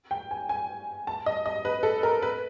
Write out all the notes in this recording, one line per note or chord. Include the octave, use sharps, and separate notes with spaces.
G5
G#5
G#5
A5
D#5
D#5
B4
A4
A#4
B4